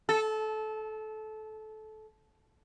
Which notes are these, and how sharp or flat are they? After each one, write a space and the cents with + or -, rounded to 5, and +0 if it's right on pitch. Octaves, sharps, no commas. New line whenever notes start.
A4 -20